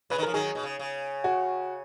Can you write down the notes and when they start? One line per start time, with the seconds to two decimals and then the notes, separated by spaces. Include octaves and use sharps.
0.10 C#3 B4
0.18 D#3
0.23 F3 A#4
0.34 D#3 F#3 G#4
0.55 B2
0.63 C#3
0.79 C#3
1.24 F#4